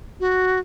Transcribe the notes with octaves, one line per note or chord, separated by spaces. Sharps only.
F#4